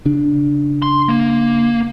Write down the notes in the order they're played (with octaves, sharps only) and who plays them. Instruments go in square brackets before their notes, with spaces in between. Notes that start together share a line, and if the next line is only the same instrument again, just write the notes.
[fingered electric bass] C#3 D4
[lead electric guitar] C6
A#3